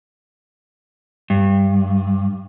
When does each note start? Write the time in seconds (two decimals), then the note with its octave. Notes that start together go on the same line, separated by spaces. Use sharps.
1.30 G2